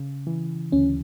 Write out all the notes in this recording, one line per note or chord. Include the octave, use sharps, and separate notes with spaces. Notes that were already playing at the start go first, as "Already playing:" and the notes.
Already playing: C#3
E3
D2 C#4